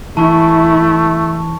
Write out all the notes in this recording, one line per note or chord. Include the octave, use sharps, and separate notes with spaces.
E3 A3 E4 A5 C#6